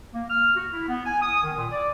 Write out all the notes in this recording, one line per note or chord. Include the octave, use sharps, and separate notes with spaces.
A#3
F6
F#4
E4
B3
G#5
D#6
D#3
A#2
D5